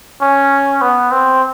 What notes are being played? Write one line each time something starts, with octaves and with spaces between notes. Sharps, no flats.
C#4
B3
C4